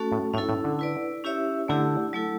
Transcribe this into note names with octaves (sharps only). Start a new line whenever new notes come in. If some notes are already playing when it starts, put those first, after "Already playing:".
Already playing: A3 C#4 F#4 A4
A2
A2 C#4 E4 A4
A2
D3
E4 B4 D5
C#4 E4 G4 C#5 E5
D3 A3 E4 G4
F#3 A3 E4 A4